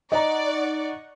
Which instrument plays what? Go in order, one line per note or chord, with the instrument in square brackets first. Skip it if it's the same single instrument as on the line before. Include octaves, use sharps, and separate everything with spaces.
[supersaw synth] D#4 F#5 C#6 [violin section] D5 [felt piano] D#5 A#5